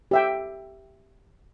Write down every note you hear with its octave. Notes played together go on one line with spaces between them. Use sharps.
G4 E5 G5